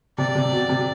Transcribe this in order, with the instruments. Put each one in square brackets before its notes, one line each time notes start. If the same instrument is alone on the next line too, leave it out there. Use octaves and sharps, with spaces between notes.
[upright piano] C3 [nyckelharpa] D5
[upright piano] C3
B2
C3